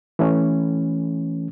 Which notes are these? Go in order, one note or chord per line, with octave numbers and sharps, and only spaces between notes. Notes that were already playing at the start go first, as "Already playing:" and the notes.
E3 A3 C#4